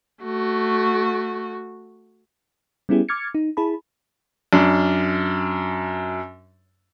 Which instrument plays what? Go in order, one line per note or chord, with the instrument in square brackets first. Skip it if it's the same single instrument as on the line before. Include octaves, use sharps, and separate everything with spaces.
[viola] A3 F#4
[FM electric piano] G3 B3 C#4 E4 G4 G#4
D6 F6 G#6 A6 C#7
D#4
E4 G#4 A5 B5
[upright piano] F#2 D4